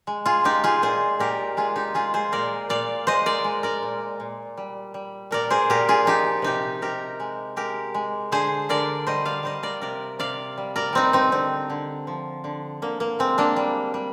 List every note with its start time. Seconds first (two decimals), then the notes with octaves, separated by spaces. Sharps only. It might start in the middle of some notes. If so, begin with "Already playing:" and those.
0.07 G#3
0.26 F4 G#4
0.44 G#3 D#4 G4
0.64 F4 G#4
0.82 A#2 G#4 C5
1.19 A#2 G4 A#4
1.57 G#3 F4 G#4
1.76 D#4 G4
1.94 G#3 F4 G#4
2.14 G#4 C5
2.32 A#2 A#4 D5
2.69 A#2 D5 F5
3.07 G#3 C5 D#5
3.26 A#4 D5
3.44 G#3
3.63 A#4 D5
3.83 A#2
4.20 A#2
4.57 G3
4.94 G3
5.31 A#2 A#4 D5
5.50 G#4 C5
5.70 A#2 G4 A#4
5.88 F4 G#4
6.05 F3 D#4 G4
6.42 C3 D#4 G4
6.82 C3 G4 A#4
7.20 G#3
7.56 G#3 G4 A#4
7.94 G#3
8.32 D3 G#4 C5
8.69 D3 A#4 D5
9.07 G3 C5 D#5
9.25 D5 F5
9.43 G3 C5 D#5
9.63 A#4 D5
9.82 C3 A#4 D5
10.19 C3 D5 F5
10.58 G3
10.76 A#4 D5
10.93 G3 C4 D#4
11.13 C4 D#4
11.32 D3 C4
11.70 D3
12.07 F3
12.44 D3
12.82 D3 A#3
13.00 A#3
13.19 G#3 C4
13.38 A#3 D4
13.56 G3
13.94 G3